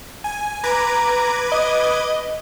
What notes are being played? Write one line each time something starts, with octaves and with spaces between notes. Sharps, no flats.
G#5
B4 A#5 D6 G#6
D#5